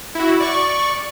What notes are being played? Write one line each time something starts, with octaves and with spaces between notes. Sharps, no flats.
E4 F#4
D5 C#6